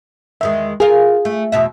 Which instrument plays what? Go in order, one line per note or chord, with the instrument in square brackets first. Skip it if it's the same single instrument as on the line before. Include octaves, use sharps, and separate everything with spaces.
[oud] E2 D#3 G#3 [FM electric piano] E5
[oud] F4 A#4 [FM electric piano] G#4
[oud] A3
E2 B2 E5